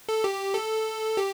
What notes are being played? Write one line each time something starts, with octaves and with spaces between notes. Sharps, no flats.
A4
G4
A4
G4